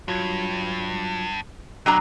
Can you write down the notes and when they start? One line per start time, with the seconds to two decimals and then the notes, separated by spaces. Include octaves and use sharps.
0.08 G2 F#3 F4 G#6
1.86 F#2 B2 F#3 D4 G5 A#5